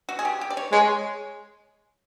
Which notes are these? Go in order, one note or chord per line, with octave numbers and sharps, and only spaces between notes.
F#4
G#4
G4
G4
D5
C#5
G#3 C#5